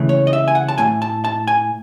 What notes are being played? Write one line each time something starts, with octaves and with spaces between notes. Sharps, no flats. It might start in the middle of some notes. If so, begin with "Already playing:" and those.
Already playing: C#2 C#3 E3 A3
C#5
D#5
E5
G#5
F#5
A5
A2 F#3 A3 G#5
A5
A5
G#5